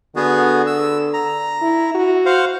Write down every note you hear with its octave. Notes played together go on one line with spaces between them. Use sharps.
D3 B3 F#4 G#4
E6
A#5
E4
F#4
C5 F5 F#5